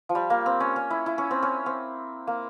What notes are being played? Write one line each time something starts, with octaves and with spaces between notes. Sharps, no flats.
F3
G3
A#3
C4
C#4
C#4
E4
E4
C#4
C4
C#4
C4
A#3